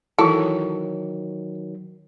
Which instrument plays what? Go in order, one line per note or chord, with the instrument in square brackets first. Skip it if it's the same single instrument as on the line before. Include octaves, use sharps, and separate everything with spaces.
[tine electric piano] D#3 F#3 [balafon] E3 E4 [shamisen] A4